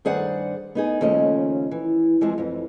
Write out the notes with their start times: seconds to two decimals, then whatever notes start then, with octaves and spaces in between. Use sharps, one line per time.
0.05 G2 D#3 G#4 C5 D5 F#5
0.75 B3 D#4 G#4
1.01 D#2 C#3 F3 A3 C#4 D#5
1.71 E3
2.21 E3 F3 G#3 C4
2.38 F2 E3